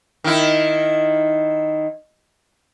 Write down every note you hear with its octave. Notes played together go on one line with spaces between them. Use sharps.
D#3 E4